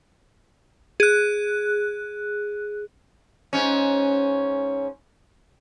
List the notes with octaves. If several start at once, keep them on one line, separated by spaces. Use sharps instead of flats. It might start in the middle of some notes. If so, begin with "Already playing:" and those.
G#4 F#6
G#2 C#4